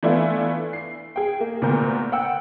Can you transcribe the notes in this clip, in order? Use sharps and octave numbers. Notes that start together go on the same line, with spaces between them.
E3 A3 B3 D4 E4 F4
C7
G#4 G5
A#3
D2 A#2 B3 A#4 G6
F#5 G5 E6